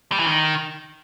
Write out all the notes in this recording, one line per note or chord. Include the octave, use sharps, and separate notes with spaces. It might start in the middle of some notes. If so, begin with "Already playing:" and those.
G3
E3
D#3